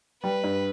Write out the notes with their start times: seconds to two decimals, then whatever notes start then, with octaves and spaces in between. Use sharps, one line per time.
0.24 G3 B4
0.44 G2